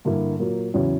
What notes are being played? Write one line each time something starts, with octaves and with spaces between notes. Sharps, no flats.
G2 D3 A#3 E4
A#2 F#3 A#3
E2 C#3 F#3 C#4 E4